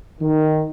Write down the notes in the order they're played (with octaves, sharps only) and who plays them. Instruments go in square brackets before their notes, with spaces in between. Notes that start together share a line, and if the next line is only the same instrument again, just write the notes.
[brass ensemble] D#3